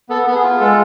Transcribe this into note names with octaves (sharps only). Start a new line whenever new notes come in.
B3 A4
B3
G#4
F4
G#3 A4